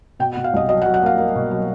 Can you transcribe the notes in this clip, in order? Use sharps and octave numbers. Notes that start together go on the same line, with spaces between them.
B2 G5
F#5
B2
F5
C2 D#5
F#3 D#5
F#5
F#3
F#5
A#3 F5
A#3
B2
F#3